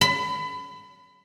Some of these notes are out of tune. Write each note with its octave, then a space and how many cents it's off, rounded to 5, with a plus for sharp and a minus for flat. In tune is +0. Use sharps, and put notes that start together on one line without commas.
B5 +25